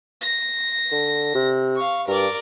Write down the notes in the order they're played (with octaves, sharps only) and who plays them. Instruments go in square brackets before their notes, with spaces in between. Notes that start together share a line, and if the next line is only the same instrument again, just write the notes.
[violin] A#6
[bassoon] D3
C3
[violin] F5 C#6
[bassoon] G2 [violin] A#4 D5